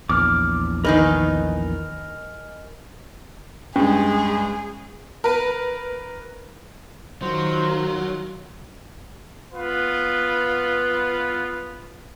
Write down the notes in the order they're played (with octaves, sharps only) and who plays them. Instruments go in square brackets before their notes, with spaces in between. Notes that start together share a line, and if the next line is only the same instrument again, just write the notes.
[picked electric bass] A#1 E2 [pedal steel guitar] D6 F6
[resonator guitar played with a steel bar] D#3 D#4 B4 [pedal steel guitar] A#4 D#5 G#5
[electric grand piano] G2 G#3 [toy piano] C#4 [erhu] G#4
[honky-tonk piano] A#4 B4
[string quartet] D#3 F4 [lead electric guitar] F#3 [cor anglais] C5
[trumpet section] B3 F4 B4